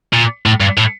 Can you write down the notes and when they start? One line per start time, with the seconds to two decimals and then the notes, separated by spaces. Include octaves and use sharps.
0.13 A#2
0.46 A2
0.60 G2
0.78 A2